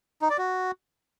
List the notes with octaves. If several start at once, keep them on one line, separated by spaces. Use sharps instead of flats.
D#4
D5
F#4